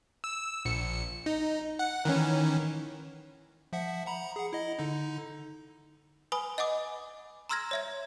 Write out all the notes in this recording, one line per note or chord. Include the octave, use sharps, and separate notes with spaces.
E6
A#1 C#7
D#4
F#5
D#3 E3 C#4
F3 E5 F#5
F#5 A#5 B5
G#4 F#5
E4 D#5
D3 D#4
B4 G#5 B5 D#6
D#5 F#5 G#5 D6 D#6
A#5 C6 E6 F6 G#6 A#6
C#5 E5 G#6